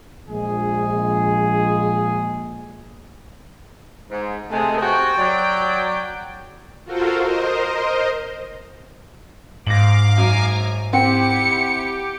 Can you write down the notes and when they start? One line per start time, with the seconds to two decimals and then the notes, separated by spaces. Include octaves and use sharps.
0.30 A#1 G#3 G#4
4.10 G#2
4.51 C3 G#3 A3 G#4
4.81 C3 F#4 G5
5.16 F#3 D5
6.85 F4 F#4 A4 A#4 C5
7.22 A#4 C5 D#5
9.67 G#2 F5 D6 A#6 F#7
10.18 F#2 G#5 A#5
10.93 C4 E4 G4 F#5 G5 C#7